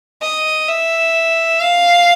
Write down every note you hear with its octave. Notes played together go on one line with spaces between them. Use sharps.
D#5
E5
F5